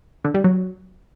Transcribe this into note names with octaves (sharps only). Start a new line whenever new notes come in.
D3
G3
F#3